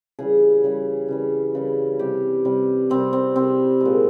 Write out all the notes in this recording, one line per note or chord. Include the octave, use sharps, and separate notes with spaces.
C#3 E3 G3 G#4
C#3 E3 G3
C#3 E3 G3
C#3 E3 G3
C3 G3 G4
C3 G3
C3 G3 C4
C4
C3 G3 C4
A#2 G#3